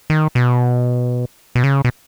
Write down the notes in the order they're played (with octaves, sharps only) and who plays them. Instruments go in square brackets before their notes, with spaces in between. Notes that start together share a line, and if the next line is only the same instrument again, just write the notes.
[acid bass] D#3
B2
B2
C#3
B2